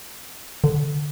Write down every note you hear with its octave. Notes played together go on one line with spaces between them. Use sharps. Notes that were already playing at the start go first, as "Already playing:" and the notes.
D3